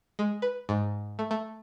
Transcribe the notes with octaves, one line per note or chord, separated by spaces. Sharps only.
G#3
B4
G#2
A3
A3